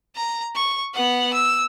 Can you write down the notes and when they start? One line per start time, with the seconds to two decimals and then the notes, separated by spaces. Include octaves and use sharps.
0.16 A#5
0.55 C#6
0.94 B3 F#5
1.33 E6